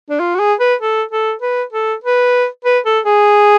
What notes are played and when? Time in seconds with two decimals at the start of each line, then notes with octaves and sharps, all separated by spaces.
0.10 D4
0.20 F4
0.35 F#4
0.39 G#4
0.60 B4
0.81 A4
1.11 A4
1.41 B4
1.72 A4
2.04 B4
2.65 B4
2.85 A4
3.05 G#4